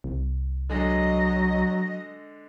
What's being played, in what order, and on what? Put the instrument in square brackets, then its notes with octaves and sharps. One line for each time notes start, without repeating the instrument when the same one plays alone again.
[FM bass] C2
[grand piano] D3 G#3 [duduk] F#3 [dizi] D#5